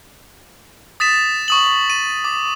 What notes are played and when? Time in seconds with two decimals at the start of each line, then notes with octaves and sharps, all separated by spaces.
1.00 D#6 A6 B6 E7
1.48 C#6 D#6 F#7
1.90 D#7
2.25 D6